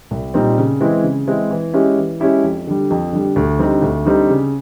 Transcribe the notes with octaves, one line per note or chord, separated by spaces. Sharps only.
C2
A#2 G3 C4 D#4
C#3
E3 G#3 C4 E4
C#3
E3 G#3 C4 E4
E3
G#3 C#4 E4 G4
E3
G#3 C#4 E4 G4
F2
D3 G3
F2
D3 G3
D2
D3 G3 C4 D#4
D2
D3 G3 C4 D#4
C#3